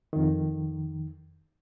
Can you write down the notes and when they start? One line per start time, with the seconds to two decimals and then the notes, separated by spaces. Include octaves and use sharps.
0.13 F2 D#3